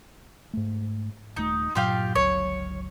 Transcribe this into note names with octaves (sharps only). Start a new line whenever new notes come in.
G#2 A3
D#1 A3 D#4
G2 A#2 F#3 F4 G4 F5
G1 C#2 F#3 C#5